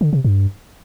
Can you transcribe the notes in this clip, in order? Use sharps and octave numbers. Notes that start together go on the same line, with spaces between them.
D3
C3
G2